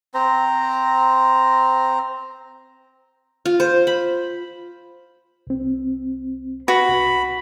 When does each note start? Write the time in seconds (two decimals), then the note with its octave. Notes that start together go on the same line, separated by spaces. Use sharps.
0.14 C4 C5 A#5
3.46 F4
3.60 C5
3.87 B5
5.47 C2 C4
6.68 F#4 B4 B5
6.90 C2